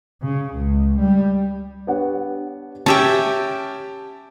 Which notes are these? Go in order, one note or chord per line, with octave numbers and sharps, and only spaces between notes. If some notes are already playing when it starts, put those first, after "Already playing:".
C#3
C#2
G3
B3 D4 G4 C#5 F#5
C#4 G4 E5 G5 A5